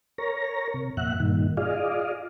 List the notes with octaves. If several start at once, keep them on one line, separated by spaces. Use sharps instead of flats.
A#4 C#5 A#5
C3
F2 A#2 E5 F#5 F#6
G2 A#2 D#3
F4 G#4 D5 D#5 F5